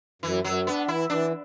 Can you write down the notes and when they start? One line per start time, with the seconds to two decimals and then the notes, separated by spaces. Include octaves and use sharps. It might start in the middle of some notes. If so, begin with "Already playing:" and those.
0.22 F#2 E3
0.44 F#2 F#3
0.67 B3 D4
0.88 E3 E4
1.09 E3 D4